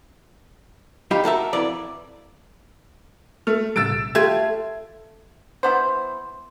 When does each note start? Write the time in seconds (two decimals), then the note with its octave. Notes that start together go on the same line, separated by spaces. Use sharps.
1.11 G3 D#4 F4 G4
1.24 F#4 A4 A#4 E5
1.53 F2 E3 D5 A#5
3.47 A3 F6
3.76 A2 C#3 G3 E6 A6 D7
3.92 B1
4.15 A3 F4 G4 G5 G#6
5.63 E3 B3 C5